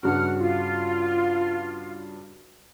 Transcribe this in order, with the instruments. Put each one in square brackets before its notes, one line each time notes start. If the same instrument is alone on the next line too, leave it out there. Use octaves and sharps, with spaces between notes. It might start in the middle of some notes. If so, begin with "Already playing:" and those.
[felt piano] G2 C#3 F#4 [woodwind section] E3 F#5 F6
[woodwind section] F4